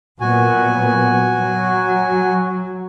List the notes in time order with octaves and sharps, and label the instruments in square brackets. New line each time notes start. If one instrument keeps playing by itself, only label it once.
[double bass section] A#2 F#3 B3 [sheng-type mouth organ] F#4 G#5
[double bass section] F#3